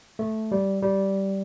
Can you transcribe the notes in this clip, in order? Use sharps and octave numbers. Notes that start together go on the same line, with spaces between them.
A3
G3
G3